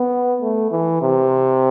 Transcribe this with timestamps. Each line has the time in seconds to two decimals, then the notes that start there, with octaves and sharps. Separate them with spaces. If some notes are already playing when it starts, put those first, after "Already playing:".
Already playing: B3
0.42 A3
0.71 E3
1.02 C3